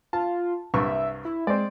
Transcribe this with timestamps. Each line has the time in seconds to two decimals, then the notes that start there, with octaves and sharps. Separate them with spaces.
0.13 F4 A5
0.74 C2 G2 E5 C#6
1.25 E4
1.47 G#3 C4 D5